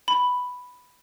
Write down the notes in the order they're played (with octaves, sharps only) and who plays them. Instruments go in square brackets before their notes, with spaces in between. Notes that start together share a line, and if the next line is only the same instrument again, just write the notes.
[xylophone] B5